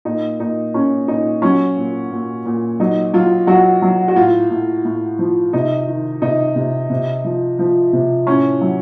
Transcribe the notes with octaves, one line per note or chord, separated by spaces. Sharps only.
A#2 D#4
A#2 D#4
A#2 C#4
A#2 D#4
F#3 C#4
A#2
A#2
A#2
F#3 D#4
F#3 F4
F#3 F#4
F#3
F#4
A2 F4
A2
A2
F3
C3 D#4
D#3
C3 D#4
C3
C3
F3
F3
C3
A2 C#4
F#3